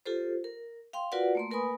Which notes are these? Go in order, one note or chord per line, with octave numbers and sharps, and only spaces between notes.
F4 G4 A4 C5
A#4
F5 G5 C6
F4 F#4 A#4 B4 D5 F#5
A3 A#3 C6
A#3 A#4 B4 G#5 B5 D#6